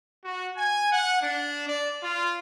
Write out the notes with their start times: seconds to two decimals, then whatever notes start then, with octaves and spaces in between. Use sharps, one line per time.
0.24 F#4
0.56 G#5
0.92 F#5
1.22 D4
1.68 D5
2.03 F4